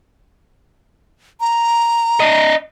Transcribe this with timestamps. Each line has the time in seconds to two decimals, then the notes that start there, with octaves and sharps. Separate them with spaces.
1.40 A#5
2.20 D4 D#5